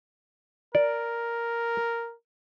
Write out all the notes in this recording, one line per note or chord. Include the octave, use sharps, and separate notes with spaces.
A#4 D5